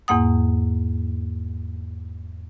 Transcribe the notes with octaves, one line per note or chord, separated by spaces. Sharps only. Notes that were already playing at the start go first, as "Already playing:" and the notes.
E2 G#2 A#3 F#5 D#6